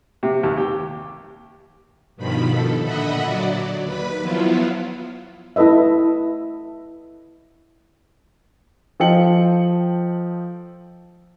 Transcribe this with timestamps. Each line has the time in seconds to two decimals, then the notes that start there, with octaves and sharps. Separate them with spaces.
0.23 C3
0.43 D#2
0.57 G4
2.16 G2 B2 D#3 F3 B5
2.48 A4
2.83 A#2 D3 D#5 E5 F#5 B5
3.25 F#3 D5
3.83 D#2 B4 B5
4.21 F3 F#3 B3 E4 F4
5.56 E4 A4 B4 D#5 E5
9.00 F3 A4 D#5 G5 C#7 F#7